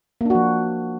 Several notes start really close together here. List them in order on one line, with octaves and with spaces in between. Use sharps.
A#3 D4 F#4 F3